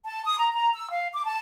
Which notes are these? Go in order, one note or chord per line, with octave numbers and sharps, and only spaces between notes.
A5
D#6
A#5
A#5
E6
F5
D6
A5